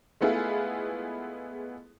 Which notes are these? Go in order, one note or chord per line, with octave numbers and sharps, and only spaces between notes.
G#3 A3 B3 E4 F4 G#4